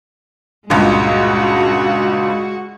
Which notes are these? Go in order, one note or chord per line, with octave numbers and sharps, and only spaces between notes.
C#2 G2 A#2 G#3 F#4